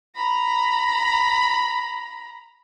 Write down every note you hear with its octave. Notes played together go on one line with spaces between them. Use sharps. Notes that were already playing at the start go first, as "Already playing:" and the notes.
A#5 B5